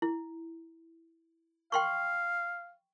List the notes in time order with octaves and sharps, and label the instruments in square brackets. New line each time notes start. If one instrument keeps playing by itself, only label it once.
[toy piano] E4
[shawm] F5 [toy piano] G5 C6 C#6